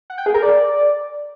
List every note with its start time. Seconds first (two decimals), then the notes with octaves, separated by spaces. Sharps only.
0.10 F#5
0.18 G5
0.26 G#4
0.34 A#4
0.43 D5